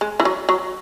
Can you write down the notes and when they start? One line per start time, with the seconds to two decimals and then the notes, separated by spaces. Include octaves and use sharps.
0.01 G#3
0.20 E3
0.25 F#3
0.49 F#3